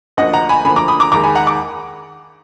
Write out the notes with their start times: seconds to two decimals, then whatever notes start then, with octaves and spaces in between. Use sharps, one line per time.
0.17 D2 D3 F3 A#3 D#5 F#5
0.33 F#5 A#5
0.49 G#5 B5
0.65 D2 D3 F3 A#3 G#5 B5
0.76 A#5 D6
0.88 B5 D#6
1.00 A#5 D6
1.12 D#2 D#3 G#3 A#5 D6
1.23 G#5 B5
1.35 F#5 A#5
1.47 D6